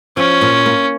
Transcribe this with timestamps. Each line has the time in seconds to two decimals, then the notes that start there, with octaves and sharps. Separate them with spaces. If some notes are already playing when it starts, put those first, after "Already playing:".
0.17 F3 C#4
0.41 A#2
0.66 A#3